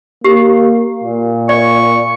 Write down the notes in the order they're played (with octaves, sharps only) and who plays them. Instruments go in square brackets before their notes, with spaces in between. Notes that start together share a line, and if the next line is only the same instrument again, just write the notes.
[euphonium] A#3 [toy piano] G4
[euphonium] A#2
[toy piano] D5 [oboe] C#6